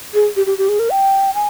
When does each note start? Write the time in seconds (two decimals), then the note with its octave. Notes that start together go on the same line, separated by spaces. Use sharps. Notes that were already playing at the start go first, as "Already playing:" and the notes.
0.14 G#4
0.36 G4
0.46 G4
0.58 G4
0.69 G#4
0.79 A#4
0.90 G5
1.34 G#5